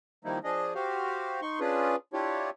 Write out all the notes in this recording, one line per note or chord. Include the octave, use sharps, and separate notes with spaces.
D#3 F3 G3 A#3 D#4 E4
F3 D4 G#4 D#5
F#4 G4 C5 F5
D#4 C6 C#6
C#4 D4 F4 G#4 B4
D4 E4 F4 G4 C#5